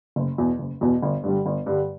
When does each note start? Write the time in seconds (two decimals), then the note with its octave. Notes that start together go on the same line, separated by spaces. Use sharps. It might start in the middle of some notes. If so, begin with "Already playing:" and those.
0.16 F#1
0.38 E2 B2
0.59 F#1
0.81 E2 B2
1.02 G1
1.24 G2 D3 G3
1.46 G1
1.66 G2 D3 G3